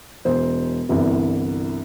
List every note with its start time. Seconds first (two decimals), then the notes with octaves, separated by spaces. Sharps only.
0.25 E1 C5
0.89 G1 C2 E3